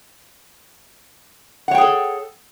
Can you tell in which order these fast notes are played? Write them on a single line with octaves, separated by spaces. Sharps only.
F#5 C#5 G5 G#4 A4